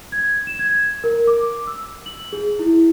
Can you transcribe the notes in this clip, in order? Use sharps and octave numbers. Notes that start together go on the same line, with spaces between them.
G#6
E7
G#6
A#4
D6
E6
F#7
G#4
E4